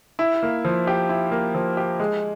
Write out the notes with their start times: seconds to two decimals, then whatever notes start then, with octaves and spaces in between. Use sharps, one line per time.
0.19 E4
0.43 A#3
0.65 F3
0.87 G4
1.09 E4
1.31 A#3
1.55 F3
1.77 G4
2.00 G#3